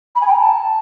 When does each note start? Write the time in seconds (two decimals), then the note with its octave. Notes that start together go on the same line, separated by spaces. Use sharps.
0.15 B5
0.21 G#5
0.27 G5
0.33 A#5
0.39 A5